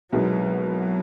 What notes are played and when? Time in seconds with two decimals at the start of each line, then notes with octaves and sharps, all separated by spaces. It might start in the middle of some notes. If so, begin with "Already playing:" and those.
0.12 C2 B2 F#3 G#3 B3 D#4
0.66 F#3